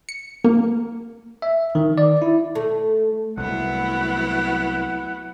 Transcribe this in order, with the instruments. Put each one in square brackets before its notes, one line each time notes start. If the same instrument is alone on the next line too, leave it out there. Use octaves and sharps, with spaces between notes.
[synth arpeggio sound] C#7
A#3
[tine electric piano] E5
D#3
D5
E4
[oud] A3
[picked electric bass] C2 A3 [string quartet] F#3 B3 E4 [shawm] F#5